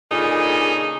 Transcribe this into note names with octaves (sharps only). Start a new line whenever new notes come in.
A#2 C#3 D4 D#4 G#4 A4